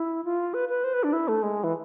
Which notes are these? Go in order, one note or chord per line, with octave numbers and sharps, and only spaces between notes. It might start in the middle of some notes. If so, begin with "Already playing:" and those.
Already playing: E4
F4
B4
B4
C5
B4
D4
E4
A3
G#3
E3